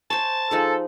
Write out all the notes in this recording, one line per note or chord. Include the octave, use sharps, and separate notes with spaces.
C5 C#5 A5
F3 D#4 G#4 A4